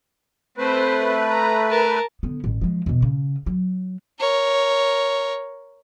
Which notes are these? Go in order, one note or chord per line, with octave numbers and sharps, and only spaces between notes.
A3 C4 B4 C5
A#5
A#4 A5
D3 B3
A1
F3 G#3
E2 B2
C#3
F#3
A#4 C#5